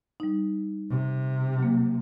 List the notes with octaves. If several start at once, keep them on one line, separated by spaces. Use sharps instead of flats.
G3 D#4
C3
F#3 A#3